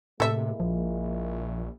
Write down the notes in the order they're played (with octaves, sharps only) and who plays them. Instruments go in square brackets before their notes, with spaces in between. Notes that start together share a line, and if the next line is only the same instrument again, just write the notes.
[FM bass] A2 [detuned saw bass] C3 [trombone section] G#3 A#3 E4 [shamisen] A4 E5
[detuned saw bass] A#1 [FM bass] F3